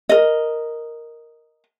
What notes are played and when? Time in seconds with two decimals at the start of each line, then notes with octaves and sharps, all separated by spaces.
0.09 A#4 D#5